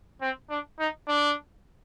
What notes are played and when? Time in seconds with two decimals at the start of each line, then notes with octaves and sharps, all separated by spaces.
0.21 C4
0.50 D4
0.79 D#4
1.08 D4